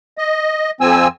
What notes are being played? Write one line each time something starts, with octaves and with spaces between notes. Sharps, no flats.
D#5
F2 F3 C4 G#5 E6